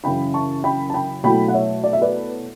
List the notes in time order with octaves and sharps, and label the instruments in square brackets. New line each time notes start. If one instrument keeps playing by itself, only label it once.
[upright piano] F#2 C#3 E3 G5 B5
A5 C#6
G5 B5
A5
G5 B5
B2 F#3 A3 E4 G5 B5
F#5
C#5 E5
D5
E5
B4 D5